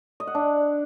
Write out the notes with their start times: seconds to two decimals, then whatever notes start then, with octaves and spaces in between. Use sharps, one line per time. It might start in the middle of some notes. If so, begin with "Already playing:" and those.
0.20 D#5
0.27 F#5
0.35 D4